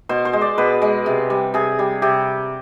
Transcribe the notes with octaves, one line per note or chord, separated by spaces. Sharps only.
B2 C5
C5
G#3
D5
B2 B4
G#3
C3
G3
C3 G#4
G3
C3 G4